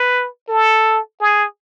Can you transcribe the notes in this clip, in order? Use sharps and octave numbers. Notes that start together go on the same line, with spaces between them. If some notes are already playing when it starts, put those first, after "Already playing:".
Already playing: B4
A4
G#4